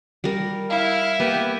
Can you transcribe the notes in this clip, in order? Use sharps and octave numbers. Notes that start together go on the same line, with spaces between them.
G3 A#4
E4 F5
A#3 B3 G4